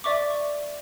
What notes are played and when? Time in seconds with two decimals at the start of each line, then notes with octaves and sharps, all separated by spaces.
0.04 D5 E5 C#6 D6